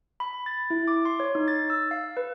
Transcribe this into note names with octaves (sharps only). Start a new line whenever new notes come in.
B5
A6
E4
D6
C6
C#5
D#4
A6
E6
F5
B4